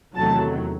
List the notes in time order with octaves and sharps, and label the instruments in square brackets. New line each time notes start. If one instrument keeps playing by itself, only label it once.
[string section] E2 C3 D#3 F#3 A3 A5